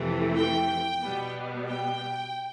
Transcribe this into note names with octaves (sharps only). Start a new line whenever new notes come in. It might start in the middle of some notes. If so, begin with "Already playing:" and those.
Already playing: F2 C3 E3 A3
G5
B2 G3 B3
G5